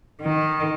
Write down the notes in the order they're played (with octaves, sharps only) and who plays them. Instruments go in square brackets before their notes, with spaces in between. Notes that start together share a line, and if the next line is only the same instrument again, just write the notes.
[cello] D#3